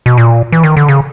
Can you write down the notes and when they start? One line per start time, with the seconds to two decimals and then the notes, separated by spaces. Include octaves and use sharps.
0.06 B2
0.18 A#2
0.52 E3
0.64 D#3
0.77 D3
0.88 C#3